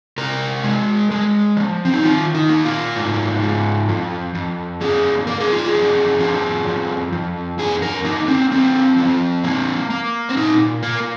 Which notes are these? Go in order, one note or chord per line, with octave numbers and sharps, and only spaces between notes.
C3 A#4
G#3
G#3
F3
C4
D#4
D#3 F4
D#4
A#3
F4
G#2
G#2
F2
F2
A#3 G#4
A#3 A#4
G#4
F4
G#4
F2
F3
F2
F2
F2 G#4
A#4
A#3 D#4
C4
F3 C4
F3
A#3
A#3
C4
A#2 D#4
A#3 A#4